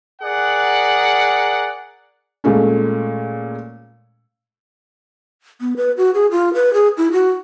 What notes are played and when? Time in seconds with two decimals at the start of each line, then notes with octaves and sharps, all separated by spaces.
0.22 G#4 A#4 D5 F#5
2.44 A#2 G#3 A3 C#4
5.61 B3
5.77 B4
5.97 F#4
6.14 G#4
6.31 F4
6.54 B4
6.74 G#4
6.98 E4
7.12 F#4